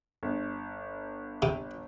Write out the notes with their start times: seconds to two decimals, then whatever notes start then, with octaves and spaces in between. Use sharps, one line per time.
0.23 G1
1.42 C3